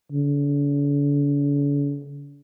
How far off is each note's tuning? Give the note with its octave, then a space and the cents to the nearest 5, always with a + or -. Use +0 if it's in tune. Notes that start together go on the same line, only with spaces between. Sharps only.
D3 -45